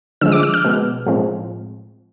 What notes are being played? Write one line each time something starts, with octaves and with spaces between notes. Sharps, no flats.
D3 F3 G#3 E6
D6
E6
F6
B2 G#3 B3
A2 F3 G#3 C4